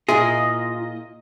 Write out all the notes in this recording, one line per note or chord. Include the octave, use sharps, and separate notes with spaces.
A#2 E4 F4 G#4 D#5